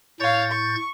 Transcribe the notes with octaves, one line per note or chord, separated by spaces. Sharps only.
A2 C#5 F5 G6 A6
C#6